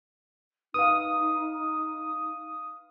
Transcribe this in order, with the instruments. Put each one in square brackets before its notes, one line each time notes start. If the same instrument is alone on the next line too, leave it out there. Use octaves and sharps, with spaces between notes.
[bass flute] D#4 [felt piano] B4 F5 [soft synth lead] D#6